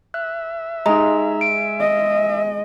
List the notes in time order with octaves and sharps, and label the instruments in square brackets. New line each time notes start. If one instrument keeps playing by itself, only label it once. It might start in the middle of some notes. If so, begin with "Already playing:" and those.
[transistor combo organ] E5 [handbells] F#6
[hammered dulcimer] G#3 [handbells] D#4 A#5
[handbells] D7
[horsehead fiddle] D#5